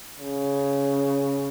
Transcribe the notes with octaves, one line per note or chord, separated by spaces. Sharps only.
C#3